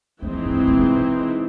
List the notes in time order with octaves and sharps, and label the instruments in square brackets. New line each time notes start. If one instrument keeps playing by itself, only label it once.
[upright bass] F2 [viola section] E3 G#3 C4 D#4
[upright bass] G2
A2
B2